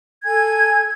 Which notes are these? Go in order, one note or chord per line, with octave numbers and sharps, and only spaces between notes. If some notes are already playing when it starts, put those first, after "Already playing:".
A4 G#5 G#6